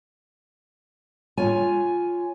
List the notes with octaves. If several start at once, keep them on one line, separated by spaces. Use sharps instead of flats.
F4 C#5 G#5